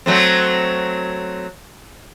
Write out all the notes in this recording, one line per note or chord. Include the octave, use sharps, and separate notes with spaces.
F#3 A3 C4